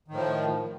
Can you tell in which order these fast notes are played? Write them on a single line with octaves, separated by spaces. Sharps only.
D#3 A2 F3